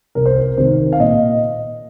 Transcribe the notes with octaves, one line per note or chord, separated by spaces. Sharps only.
C2 A#4
C5
A#4
C3 D#3 C5
F5
A#2 D#5